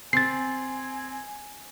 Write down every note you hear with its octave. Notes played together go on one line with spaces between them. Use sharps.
C4 G#5 A6 C7